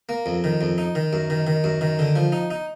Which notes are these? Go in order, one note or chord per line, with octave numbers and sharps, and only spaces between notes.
A#3
F2
D#3
F2
D#4
D#3
F#2
D#3
D#3
F#2
D#3
D3
F3
D#4
D#4